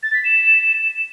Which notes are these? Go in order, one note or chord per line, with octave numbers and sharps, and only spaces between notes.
A6
B6
E7